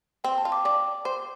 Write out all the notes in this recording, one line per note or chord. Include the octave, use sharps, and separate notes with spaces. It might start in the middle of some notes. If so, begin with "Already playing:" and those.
C4 G5
A5
F4
D6
D4 D6
C5